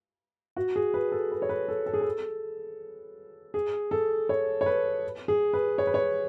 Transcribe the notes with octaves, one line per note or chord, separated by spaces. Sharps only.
F#4
G#4
B4
A4
B4
C#5
B4
A4
A4
G#4
A4
G#4
A4
C#5
C#5
B4
G#4
B4
C#5
B4
C#5